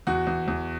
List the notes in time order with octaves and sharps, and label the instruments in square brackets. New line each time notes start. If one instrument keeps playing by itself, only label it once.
[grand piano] E2 F#4
E2
E2